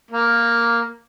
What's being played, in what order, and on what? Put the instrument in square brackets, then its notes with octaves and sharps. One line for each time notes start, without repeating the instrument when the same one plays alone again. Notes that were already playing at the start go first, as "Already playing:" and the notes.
[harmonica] A#3